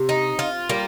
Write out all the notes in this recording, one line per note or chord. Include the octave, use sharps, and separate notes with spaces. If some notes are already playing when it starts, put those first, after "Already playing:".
Already playing: C3
D#4
F4
G3 A#3